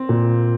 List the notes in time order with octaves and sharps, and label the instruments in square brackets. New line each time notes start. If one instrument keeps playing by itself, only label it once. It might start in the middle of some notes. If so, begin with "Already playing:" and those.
Already playing: [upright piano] C4
[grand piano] A#2